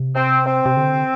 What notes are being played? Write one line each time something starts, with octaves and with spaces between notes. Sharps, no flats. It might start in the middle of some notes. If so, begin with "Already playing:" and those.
Already playing: C3
C4
C4
C3
D3